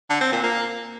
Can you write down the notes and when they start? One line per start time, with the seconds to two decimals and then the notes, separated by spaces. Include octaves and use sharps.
0.10 D3
0.21 C4
0.32 A#2
0.43 A#3